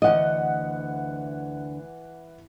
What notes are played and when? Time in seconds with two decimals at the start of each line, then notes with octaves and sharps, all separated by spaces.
0.02 D2 E3 D#5 F#5